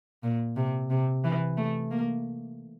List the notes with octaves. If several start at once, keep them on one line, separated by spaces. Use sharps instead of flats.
A#2
C3
C3
E3
A3
A#3